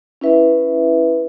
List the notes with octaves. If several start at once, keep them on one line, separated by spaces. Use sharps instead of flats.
C#4 E4 B4 E5